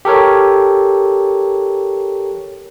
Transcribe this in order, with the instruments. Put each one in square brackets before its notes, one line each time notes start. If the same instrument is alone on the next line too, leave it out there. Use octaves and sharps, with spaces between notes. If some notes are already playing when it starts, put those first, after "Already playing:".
[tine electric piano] G4 A4 A#4 C#5